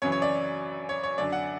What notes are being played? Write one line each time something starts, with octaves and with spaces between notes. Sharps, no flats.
F#2 C#3 E3 C#5
C#5
D5
C#5
C#5
F#2 D3 D5
F#5